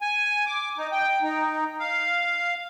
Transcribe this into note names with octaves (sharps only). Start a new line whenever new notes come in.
G#5
D6
D#4
G5
D#4
F5